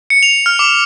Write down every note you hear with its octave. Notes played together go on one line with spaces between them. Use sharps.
C#7
F7
F6
D6